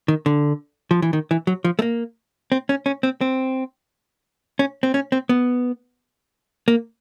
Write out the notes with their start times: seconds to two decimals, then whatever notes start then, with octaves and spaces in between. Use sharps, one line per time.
0.08 D#3
0.26 D3
0.91 F3
1.02 E3
1.13 D#3
1.31 E3
1.47 F#3
1.65 F3
1.79 A3
1.82 A#3
2.52 C4
2.69 C#4
2.86 C#4
3.03 C4
3.21 C4
4.59 C#4
4.83 C4
4.94 C#4
5.12 C4
5.29 B3
6.68 A#3